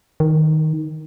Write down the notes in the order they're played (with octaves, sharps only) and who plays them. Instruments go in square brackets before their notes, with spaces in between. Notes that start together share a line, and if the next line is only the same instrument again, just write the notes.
[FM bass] D#3